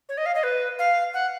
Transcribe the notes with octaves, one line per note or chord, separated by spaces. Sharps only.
C#5
D#5
F5
D#5
B4
F5
F#5